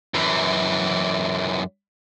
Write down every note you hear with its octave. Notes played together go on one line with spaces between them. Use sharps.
F#2 E3